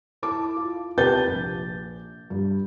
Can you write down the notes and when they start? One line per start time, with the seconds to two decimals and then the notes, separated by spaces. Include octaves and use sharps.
0.23 E4 A5 D6
0.57 F4
0.98 C3 G4 B4 A5 G6 A6
1.28 A#1
2.30 G2